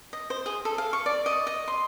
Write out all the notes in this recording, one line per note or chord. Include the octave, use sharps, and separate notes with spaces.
D#5
C5
G#4
A4
F5
C#6
D5
D#5
D#5
C6